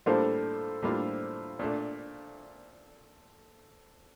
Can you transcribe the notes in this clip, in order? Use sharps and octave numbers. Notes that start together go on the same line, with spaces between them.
A2 G3 A#3 D4 F4 A4 C5
A2 G3 A#3 D4 F4
A#2 A3 D4